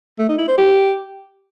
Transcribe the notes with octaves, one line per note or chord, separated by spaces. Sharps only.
A3
D#4
E4
C5
G4